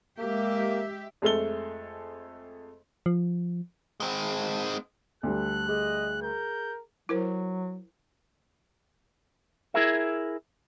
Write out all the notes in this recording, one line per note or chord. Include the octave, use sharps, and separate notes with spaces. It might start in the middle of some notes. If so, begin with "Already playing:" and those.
G#3 A#3 G4 E5
F2 G#3 A3 A4 G7
F3
G#3 C4
D2 G3 A4 F#6
G#4 D#5
A#4 G6
F#3 E4 A#4 C5
E4 G#4 A#4 E5